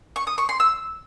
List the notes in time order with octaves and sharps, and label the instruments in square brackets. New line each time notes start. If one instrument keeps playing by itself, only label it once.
[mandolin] C#6
D#6
C#6
C6
E6